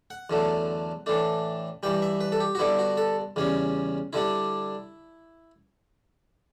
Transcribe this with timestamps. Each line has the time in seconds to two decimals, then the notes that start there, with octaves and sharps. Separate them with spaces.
0.10 F#5
0.30 E2 D3 F#3 A3
1.06 A2 E3 A3 D4
1.83 G2 E3 G3 G5
2.02 E5
2.21 B4
2.32 A4
2.40 G4
2.55 F#4
2.59 G2 D3 G3 B3 E4
2.79 F#4
2.97 A4
3.36 E2 C#3 G3 C#4
4.13 D3 G3 D4 E4